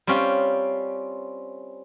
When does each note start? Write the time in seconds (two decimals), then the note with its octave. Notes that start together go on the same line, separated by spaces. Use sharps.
0.07 G3 C4 C#4 F4 G4